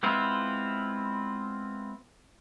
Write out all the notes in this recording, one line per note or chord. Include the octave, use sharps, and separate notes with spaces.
G#3 B3 C4 E4 F4